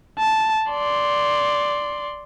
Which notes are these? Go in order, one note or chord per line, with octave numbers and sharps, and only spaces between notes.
A5
D5 C6